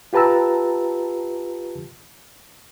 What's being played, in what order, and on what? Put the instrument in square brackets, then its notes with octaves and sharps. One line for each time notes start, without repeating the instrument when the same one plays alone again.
[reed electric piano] F4 G4 B4 A5 A#5 E6